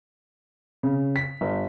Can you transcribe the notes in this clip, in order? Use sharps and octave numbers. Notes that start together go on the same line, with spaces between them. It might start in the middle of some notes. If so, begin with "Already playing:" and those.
C#3
B6
G1